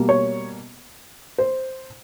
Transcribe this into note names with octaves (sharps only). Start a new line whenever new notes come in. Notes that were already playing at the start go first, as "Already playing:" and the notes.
Already playing: B2 G3 A#3
C#5
C5